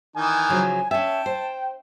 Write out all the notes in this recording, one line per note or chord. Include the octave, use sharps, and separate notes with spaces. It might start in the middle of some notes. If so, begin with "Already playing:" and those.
D#3 E3 D#4 G#5
C#3 F3 F#3
C#4 E5 G5 A5
C5